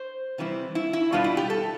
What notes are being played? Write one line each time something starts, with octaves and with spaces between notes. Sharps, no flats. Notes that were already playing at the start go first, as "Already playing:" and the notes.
Already playing: C5
C3 E3 G3 C4 E4
E4
E4
B2 G3 B3 D4 F4
E4
G4
A4